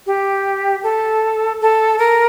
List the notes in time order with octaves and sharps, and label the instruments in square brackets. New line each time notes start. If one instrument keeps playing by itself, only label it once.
[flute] G4
A4
A4
A#4